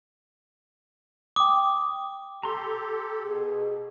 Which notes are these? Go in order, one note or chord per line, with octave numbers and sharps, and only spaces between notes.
G5 D6 D#6
G4 A4 A#5 C6
B2 G#4